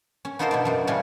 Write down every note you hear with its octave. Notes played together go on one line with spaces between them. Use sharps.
C#4
B3 D#4 F4 A4 A#4 C5
B2 E4 D5
F#2 F#3 D5
A2 C#3 G3 C#4